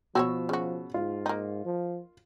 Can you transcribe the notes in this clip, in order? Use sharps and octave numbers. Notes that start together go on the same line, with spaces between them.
B2 F3 F#4 G4 C#5 E6
C#3 F#4
G#2 F4
A#3 D#4
F3